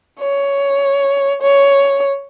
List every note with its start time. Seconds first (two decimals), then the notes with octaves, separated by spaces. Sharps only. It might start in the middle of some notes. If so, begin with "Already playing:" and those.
0.20 C#5
1.42 C#5